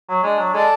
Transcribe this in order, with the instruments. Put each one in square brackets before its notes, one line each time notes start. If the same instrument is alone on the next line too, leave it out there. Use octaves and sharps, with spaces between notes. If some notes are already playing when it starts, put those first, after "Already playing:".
[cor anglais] F#3
[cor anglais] G#3 [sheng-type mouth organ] D4
[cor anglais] F#3
[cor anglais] G#3 [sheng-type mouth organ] A4 D5 A5